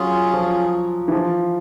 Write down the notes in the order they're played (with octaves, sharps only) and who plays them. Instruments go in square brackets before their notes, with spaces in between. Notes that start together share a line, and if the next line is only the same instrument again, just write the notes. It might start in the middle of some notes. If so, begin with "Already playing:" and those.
Already playing: [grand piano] F#3 [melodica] C#4 F4 G#4
[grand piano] F3
E3
F3